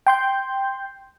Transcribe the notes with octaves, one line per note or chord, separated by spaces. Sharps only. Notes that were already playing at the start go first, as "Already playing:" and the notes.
G5 C6 G6